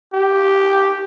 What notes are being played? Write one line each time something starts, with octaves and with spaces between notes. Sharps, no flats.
G4